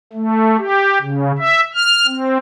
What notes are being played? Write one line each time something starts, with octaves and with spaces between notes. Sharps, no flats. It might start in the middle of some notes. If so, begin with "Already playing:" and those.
A3
G4
C#3
E5
F6
C4